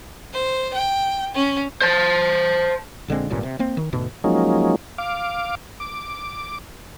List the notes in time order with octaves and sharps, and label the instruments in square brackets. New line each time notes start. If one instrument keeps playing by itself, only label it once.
[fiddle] C5
G5
C#4
[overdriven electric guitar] C5 A5
[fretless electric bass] A#1 D3 G#3 C4
G#1 G2 A#2 C#3
C3
A#3 C4
D#3
D2 G#2 B2
[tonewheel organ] F3 F#3 G#3 A#3 C#4 D#4
F5 D6
D6